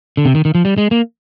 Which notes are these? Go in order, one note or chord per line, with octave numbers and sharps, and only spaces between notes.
D3
C3
D#3
D#3
F3
G3
G#3
A#3